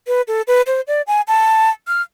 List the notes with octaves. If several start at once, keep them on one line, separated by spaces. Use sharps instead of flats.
B4
A4
B4
C5
D5
G#5
A5
F6